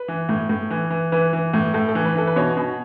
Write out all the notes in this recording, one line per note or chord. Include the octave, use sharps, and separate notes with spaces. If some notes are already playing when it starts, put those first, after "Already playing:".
Already playing: B4
E3
A2
A2
E3
E3
E3 B4
E3
A2
A2 A4
A4
E3
B4
E3 A4
B4
B2 C#5
B2